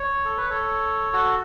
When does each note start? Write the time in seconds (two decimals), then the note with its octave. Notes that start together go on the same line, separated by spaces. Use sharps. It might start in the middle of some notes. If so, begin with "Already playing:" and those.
Already playing: C#5
0.25 A4
0.37 B4
0.50 A4 C#5
1.13 F#4 A4